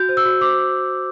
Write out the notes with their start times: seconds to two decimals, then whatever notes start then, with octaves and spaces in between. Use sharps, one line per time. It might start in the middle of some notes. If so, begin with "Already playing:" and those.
Already playing: F#4 G6
0.09 C5
0.17 E6
0.25 F#4
0.41 C5 D6